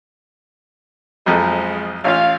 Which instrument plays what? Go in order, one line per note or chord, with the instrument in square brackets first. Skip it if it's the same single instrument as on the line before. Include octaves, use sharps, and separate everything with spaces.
[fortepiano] B1 F2 [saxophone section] F3 G#3
[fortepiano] A1 C#4 F4 [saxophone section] F5